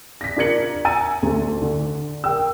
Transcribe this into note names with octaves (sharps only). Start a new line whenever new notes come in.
A#6 B6
D4 F4 A#4 G#6 C#7 F#7
G#5 A#5 E6 A6 D#7
D2
D3
A#4 G5 E6